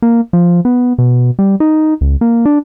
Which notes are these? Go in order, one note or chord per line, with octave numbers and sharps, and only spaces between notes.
A#3
F3
B3
B2
G3
D#4
C#2
A#3
D4